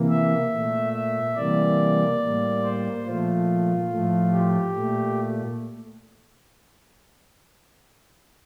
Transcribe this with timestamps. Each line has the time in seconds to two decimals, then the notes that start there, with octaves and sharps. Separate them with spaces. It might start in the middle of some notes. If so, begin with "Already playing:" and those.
Already playing: C3 E3 A#3
0.09 E5
0.51 A#2 A3
0.93 E5
1.35 C3 E3 G3 A#3 D5
2.20 A2 G3 A#3
2.63 C5
3.05 A#2 F3 A3 F4
3.89 A2 F3 A3
4.31 G4
4.74 A#2 A3